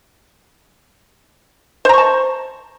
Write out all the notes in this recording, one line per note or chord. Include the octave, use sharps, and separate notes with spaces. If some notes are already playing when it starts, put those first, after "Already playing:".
C5 A5 A#5 C#6